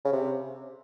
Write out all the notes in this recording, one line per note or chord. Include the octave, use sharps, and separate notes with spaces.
C#3
C3